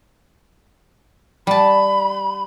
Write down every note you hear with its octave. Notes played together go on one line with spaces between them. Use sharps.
G3 A5 B5